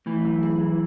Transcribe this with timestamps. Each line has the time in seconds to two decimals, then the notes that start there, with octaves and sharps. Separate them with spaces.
0.06 E3 A3
0.25 F#3
0.43 G#4
0.61 F#3